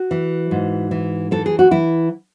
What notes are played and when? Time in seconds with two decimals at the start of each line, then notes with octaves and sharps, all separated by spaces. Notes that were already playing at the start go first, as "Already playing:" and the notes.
Already playing: F#4
0.11 E3
0.51 G#2
0.91 E3
1.31 E3 A4
1.46 G#4
1.59 F#4
1.71 E3 E4